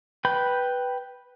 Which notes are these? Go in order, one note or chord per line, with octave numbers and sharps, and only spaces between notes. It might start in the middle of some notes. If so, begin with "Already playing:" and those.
B4 G5 B5 G6